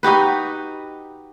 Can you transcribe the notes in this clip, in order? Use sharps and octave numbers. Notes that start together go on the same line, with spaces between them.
D#4 F#4 G4 B4